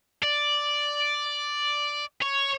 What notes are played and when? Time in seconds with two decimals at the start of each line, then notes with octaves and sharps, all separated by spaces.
0.23 D5
2.22 C#5